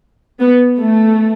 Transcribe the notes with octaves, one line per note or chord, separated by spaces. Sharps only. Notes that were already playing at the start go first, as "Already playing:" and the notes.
B3
A3